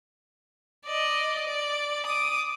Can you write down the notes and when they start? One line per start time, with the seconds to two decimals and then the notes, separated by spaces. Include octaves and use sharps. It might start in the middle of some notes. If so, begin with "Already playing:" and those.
0.86 D5 D#5
1.45 D5
2.06 D6 D#6